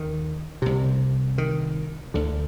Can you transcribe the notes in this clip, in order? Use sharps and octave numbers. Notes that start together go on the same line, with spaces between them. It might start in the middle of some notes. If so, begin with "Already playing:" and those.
Already playing: D#2 D#3
C2 C3
D#3
D2 D3